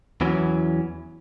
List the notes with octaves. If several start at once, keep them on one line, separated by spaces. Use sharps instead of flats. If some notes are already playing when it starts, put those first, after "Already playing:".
E2 E3 F#3 C#4